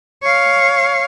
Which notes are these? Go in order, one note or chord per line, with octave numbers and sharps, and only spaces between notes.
C#5 F5